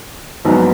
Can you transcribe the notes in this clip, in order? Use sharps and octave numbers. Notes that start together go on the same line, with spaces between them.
A#1 G#2 F#3 B3